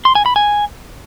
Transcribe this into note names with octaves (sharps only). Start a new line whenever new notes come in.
C6
G#5
B5
G#5